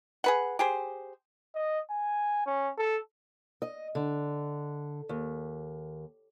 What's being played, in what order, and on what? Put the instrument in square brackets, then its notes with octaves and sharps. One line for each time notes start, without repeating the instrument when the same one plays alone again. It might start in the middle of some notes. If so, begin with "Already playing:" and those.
[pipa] G#4 B4 F#5
G4 G#4 C5
[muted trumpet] D#5
G#5
C#4
A4
[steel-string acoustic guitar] D#5
D3
D#2